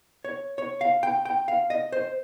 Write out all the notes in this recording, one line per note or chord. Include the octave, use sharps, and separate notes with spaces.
C#5
C#5
F5
G5
G5
F5
D#5
C5